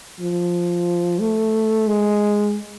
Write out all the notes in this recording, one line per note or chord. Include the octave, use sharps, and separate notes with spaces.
F3
A3
G#3